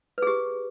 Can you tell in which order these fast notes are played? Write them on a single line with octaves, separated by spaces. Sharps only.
B4 G#4 G4